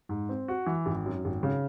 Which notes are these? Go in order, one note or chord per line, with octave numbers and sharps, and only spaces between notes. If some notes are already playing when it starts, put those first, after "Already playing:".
G#2
C4
F#4
E3
G#1
F#2
G#1
C#3